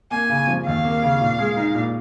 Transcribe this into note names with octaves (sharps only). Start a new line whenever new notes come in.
A#3 G#5
C#3
F3
D#2 F5
A#3
C#3
A#2
G#3
D#4
A#2